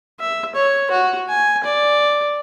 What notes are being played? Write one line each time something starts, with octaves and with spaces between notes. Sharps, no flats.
E5
C#5
F#4
G#5
D5